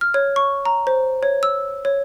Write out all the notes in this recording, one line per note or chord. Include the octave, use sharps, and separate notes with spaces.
F6
C#5
C#6
A#5
C5
C#5
E6
C#5